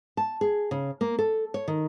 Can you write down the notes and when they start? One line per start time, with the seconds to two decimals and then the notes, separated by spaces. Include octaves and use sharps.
0.17 A5
0.41 G#4
0.71 C#3
1.01 A#3
1.19 A4
1.54 C#5
1.68 D#3